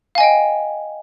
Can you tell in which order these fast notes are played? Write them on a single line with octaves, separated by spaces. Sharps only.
F5 G#5 D#5 G5